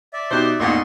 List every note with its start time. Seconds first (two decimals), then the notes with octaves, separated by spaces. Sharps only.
0.13 D5 E5
0.31 B2 D#4 G4 C5
0.60 A1 E2 A#2 D#4 D#5 C6 C#6